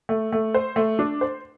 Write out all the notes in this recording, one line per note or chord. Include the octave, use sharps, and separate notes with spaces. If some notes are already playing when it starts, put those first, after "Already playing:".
A3
A3
C5
A3
D4
C5